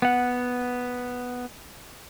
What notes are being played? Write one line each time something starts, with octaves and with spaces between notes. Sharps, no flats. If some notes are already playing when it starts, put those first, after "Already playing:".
B3 F#5